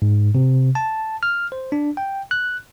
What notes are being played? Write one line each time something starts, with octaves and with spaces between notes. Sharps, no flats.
G#2
C3
A5
F6
C5
D4
G5
F#6